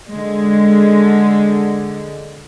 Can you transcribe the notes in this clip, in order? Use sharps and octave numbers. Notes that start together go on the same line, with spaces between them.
D3 G#3